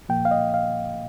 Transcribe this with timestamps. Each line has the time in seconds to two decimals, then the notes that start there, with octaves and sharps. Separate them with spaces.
0.09 A#2 F3 A#3 G5
0.25 F5
0.31 D#5
0.54 F5